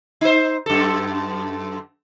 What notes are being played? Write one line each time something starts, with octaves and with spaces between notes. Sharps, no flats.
D#4 C5
F#2 A4